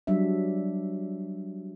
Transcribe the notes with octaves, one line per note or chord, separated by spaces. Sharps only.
F#3 G3 D4 E5